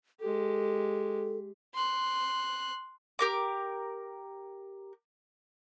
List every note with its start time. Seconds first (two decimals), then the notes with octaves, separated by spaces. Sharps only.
0.20 G#3 G4 A4
1.74 C6 F#6
3.19 G4 A#4 D6